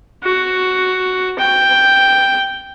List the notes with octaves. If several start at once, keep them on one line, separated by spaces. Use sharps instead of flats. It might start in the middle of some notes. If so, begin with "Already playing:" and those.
F#4
G5